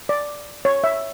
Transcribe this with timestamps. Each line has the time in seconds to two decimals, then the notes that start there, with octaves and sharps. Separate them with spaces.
0.09 D5
0.65 C#5
0.84 E5